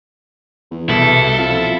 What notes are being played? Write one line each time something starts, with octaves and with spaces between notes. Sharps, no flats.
E2
C2 B2 E4 A4
F2 F5